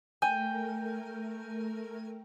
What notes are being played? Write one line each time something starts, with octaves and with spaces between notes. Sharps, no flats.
A3 A#4 G5 G#5